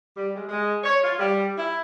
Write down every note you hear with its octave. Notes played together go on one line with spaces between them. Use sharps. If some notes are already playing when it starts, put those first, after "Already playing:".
G3
G#3
G#3
C#5
F4
G3
E4